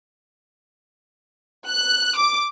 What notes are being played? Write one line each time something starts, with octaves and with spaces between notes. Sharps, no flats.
F#6
D6